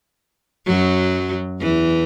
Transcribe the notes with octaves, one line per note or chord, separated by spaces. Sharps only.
F#2 F#3
E2 E3